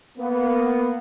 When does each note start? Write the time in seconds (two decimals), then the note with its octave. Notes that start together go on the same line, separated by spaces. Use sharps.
0.18 A#3 B3